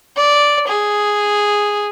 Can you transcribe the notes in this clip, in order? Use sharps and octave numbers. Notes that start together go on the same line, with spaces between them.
D5
G#4